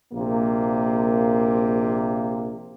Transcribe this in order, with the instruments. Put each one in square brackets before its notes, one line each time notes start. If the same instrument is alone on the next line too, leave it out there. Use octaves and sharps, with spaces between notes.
[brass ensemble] A#1 C3 A#3